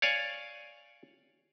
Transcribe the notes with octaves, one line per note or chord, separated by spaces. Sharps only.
C#5 D5 F5 G#5